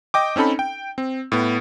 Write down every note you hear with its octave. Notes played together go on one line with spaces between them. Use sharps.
D#5 G5 D6
C4 C#4 D#4 A4 B5
G5
C4
A2 B3